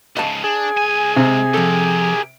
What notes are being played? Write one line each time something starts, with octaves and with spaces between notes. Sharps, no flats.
G#2 C#3 D#5 F5 A5
D4 G#4
C2 G#5
G#2 C3
F3 G4 A4 A#4